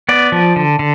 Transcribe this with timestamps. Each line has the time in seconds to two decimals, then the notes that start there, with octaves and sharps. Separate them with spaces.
0.09 B3 D5
0.32 F3
0.56 D3
0.79 D3